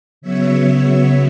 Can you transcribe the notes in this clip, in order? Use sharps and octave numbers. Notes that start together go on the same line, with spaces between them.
C#3 F#3 B3 C#5 E5